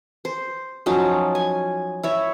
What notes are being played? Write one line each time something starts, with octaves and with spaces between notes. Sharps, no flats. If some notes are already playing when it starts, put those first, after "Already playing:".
C5
F3 F#3 C#4 D#4
G#5
E4 C#5 E5